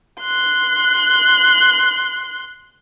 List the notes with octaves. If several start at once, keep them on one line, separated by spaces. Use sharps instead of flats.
C6 F#6